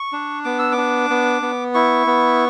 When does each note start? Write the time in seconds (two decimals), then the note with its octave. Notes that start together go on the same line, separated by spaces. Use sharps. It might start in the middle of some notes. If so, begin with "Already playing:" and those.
Already playing: C#6
0.13 D4
0.44 B3 D6
0.59 E6
0.72 D6
0.77 D4
1.10 B3
1.42 B3
1.74 E4 C#6
2.07 B3